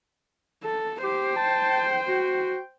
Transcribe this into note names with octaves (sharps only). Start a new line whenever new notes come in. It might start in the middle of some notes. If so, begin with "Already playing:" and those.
A4
G4 C5 G5
A5
F#4